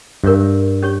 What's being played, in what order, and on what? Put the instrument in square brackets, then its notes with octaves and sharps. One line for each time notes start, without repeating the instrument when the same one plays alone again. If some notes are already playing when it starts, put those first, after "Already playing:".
[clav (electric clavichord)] G2 [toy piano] A#4 C#5 E5
[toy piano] C#4 G4 C#5